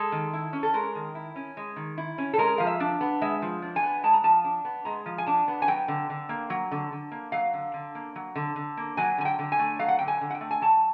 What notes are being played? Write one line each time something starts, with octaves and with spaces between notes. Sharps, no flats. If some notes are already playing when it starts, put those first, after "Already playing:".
Already playing: G#3 A4
D#3
E4
C#4
A4
G#3 A#4
D#3
E4
C#4
G#3
D#3
E4
C#4
A4
G#3 A#4
F3 F5
E5
D4
B3
G#3 E5
F3
D4
G#5
B3
G#3 A5
A#5
F3 A5
D4
B3
G#3 A#5
F3
G#5
D4 A5
B3
G#5
F#3 G5
D3
D3
A#3
F#3
D3
D3
A#3
F#3 F5
D3
D3
A#3
F#3
D3
D3
A#3
F#3 G#5
D3 G#5
G5
D3
G#5
A3
F#3 F5
F#5
D3 G5
G#5
D3
F#5
G5
A3
G#5
F#3 A5